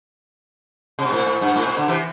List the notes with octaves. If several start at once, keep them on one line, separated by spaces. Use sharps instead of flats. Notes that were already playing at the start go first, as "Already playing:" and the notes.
C3
B2
A2
A2
G2
A2
B2
D3
C3 E3